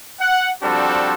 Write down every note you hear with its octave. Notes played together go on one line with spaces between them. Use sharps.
F#5
F3 G3 C4 D4 F#4 A4